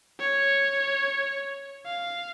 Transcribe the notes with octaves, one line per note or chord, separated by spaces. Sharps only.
C#5
F5